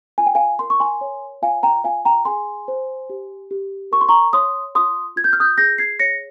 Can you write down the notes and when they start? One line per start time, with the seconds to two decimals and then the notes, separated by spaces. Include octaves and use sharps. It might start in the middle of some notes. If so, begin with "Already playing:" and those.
0.18 F4 G#5
0.26 G5
0.35 F5 G#5
0.59 A#4 C6
0.70 C#6
0.80 G#5 C6
1.01 C#5
1.42 F4 F5 G#5
1.63 G5 A#5
1.84 F4 F5 G#5
2.05 G5 A#5
2.25 G#4 G#5 C6
2.68 C5
3.10 G4
3.51 G4
3.92 A#4 C#6
4.01 C6
4.08 A#5 C#6
4.33 C#5 C6 D#6
4.75 F4 C6 D#6
5.16 F4 G#6
5.24 G6
5.33 F6
5.40 D#6 G6
5.58 G#4 G6 A#6
5.78 G#6 C7
5.99 C#5 A#6 C#7